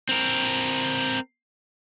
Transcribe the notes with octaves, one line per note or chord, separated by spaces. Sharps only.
C4 A#4